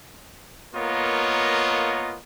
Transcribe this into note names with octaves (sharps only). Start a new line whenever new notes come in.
A#3 B3 F4 A#4 C#5 D#5